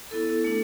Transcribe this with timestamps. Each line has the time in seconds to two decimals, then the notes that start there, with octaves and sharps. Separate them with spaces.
0.11 B3 E4 A4
0.44 A3 D4